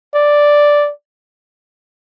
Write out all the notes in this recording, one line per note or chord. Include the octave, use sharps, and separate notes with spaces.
D5